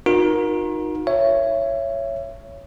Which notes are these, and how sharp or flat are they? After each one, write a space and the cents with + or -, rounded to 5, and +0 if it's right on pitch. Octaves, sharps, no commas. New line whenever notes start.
D#4 +0 F#4 -45 A#4 +20
C#5 +0 E5 +30